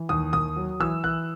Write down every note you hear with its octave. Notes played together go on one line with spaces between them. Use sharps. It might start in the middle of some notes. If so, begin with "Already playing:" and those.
Already playing: E3
D#2 D#6
D#2 D#6
F#3
E3 E6
E3 F#6